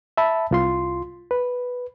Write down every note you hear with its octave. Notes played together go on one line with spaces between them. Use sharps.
E5 A5 B5
C2 F4 C6
B4